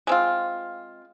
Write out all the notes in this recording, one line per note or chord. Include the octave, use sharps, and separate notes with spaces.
G#3 C4 F4